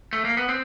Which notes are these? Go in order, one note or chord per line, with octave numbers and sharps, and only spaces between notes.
A3
A#3
B3
C4